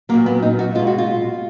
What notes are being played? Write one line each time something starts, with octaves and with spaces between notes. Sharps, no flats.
A#2 F#3 A#3
B3
D#4
F#4
B2 G#3 F4
F#4
F4